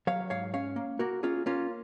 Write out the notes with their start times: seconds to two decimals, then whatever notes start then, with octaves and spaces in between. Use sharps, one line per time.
0.07 F#3 C#5 F5
0.30 G#2 C#5 F5
0.54 C#4 C#5 F5
0.76 A#3
0.99 A#3 F#4 A#4
1.23 C#4 F4 G#4
1.46 A#3 C#4 F4